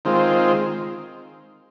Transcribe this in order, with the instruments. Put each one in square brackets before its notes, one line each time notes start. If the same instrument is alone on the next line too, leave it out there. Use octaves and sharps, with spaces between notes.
[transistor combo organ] D#3 G#3 C4 F4